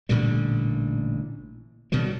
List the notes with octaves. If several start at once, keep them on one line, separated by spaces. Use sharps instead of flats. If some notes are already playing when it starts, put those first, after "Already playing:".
A1 A#2 D3 G3
B2 D#3 F#3 G3